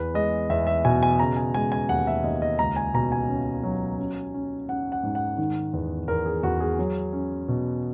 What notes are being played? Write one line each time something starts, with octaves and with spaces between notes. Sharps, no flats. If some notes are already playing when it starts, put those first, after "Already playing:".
Already playing: E2 B4
G#3 D#5
E2 E5
E5
B2 G#5
G#5
C#3 A#5
G#5
G#3 G#5
G#5
D#2 F#5
E5
D#2 D#5
D#5
C#2 A#5
G#5
B2 A#5
G#5
C#4
F#3
C#4
C#4
C#4 F#5
F#5
G#2
F#5
D#3
E2
E2 A#4
G#4
E2 F#4
G#4
F#3
C#4
B2